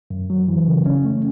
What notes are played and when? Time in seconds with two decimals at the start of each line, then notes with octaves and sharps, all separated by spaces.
0.10 F#2
0.30 F#3
0.48 E3
0.67 C#3
0.86 C#4
1.04 A3